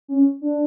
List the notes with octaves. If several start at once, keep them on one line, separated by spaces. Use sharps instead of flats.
C#4
D4